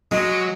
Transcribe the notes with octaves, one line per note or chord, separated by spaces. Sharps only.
F#3 G#3